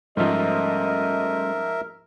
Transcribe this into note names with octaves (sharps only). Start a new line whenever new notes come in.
G#2 F3 G3 A3 C#4 A#4 D#5 E5